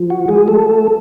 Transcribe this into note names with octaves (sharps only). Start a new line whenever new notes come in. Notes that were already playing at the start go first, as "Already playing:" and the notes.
Already playing: F3
F#4
G#3 G#4
A3 A4